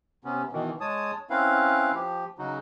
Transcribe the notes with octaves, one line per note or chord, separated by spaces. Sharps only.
C3 B3 C#4
B2 D#3 E3
G#3 C#5 A5 D#6
C4 C#4 E4 B4 F5
F3 G4
C#3 F#3 D#4 F#4